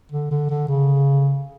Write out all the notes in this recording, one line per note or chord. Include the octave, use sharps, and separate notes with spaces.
D3
D3
D3
C#3